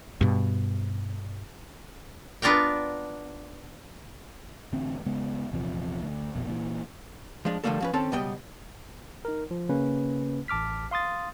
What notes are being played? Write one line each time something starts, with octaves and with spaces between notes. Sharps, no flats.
G2 B2
B3 D4 F4 A#4 G5
A1 D3 C4
C#3 G#3 B3
A#1 E2 C3 F3
D2
A#1 F2 B2
A#2 D#3 E3
F3 G#3 D4
D3 F3 G3 A3 A#3 A4
F3 C#4 B4
D#3 C4 C#4 A4 A5
C#2 B2 G3 B3 D#5 G5
D#4 A#4
F3
C#3 A#3 C#4 B4
A1 A5 D6 F6 B6
F5 C6 D#6 A6